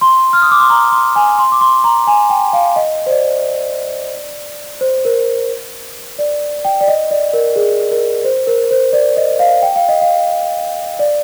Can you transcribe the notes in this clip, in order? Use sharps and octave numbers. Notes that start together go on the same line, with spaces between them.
C6
F6
D#6
D6
C6
A#5
C6
G#5
C6
D6
C6
A#5
G#5
G5
F5
D#5
C5
D5
C5
A#4
D5
G5
D5
D#5
D5
A#4
G#4
A#4
C5
A#4
C5
D5
D#5
F5
G5
F5
D#5
F5
D5